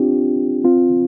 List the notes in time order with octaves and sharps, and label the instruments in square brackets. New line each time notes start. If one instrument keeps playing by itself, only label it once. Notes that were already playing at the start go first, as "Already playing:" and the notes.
Already playing: [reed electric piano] C4 D4 F4 G4
C4 F4